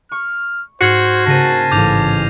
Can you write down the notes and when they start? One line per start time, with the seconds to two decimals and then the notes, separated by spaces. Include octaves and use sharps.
0.12 C#6 F6
0.81 G#2 F#4 C5 F6 G#6 C7
1.27 C#3 A#3 C5 A5 A#6 D#7
1.71 A1 G#2 D6 G6 F7